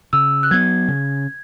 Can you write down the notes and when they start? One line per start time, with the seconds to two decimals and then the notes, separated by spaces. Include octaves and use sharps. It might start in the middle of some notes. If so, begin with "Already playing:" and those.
0.13 C#3 E6
0.43 F#6
0.51 F#3 B3 G#6
0.88 C#3